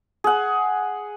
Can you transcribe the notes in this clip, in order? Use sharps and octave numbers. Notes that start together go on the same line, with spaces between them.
G#4 F#5